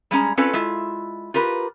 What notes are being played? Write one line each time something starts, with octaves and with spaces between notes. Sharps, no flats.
G3 G#3 C#4 A#5
C4 C#4 F4 A4 B4 D5
G#3 E4 F4
F4 G4 A#4 B4